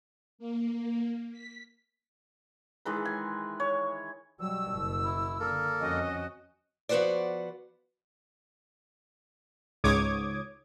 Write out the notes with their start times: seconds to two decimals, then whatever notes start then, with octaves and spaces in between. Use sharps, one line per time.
0.39 A#3
1.32 B6
2.85 D#3 E3 G#3 B4
3.05 G#5
3.60 C#5
4.40 B2 F#3 G3 E6
4.72 F#1
5.05 E4
5.40 D3 A#3 A4 A#4
5.80 F2 C#4 F#4 D#5
6.89 F3 B3 F#4 B4 C5 D5
9.84 C#2 G#2 C#5 D6 D#6 G#6